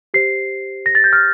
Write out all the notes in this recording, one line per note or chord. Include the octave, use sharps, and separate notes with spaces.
G4 C5 C7
A#6
A6
G6
F6